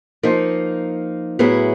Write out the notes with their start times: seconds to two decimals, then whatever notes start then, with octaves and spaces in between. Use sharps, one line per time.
0.23 F3 A#3 D#4
1.39 A2 F#3 B3 E4 G#4